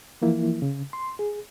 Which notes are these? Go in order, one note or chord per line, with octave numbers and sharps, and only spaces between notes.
E3 F3 A#3 E4
C#3
C6
G#4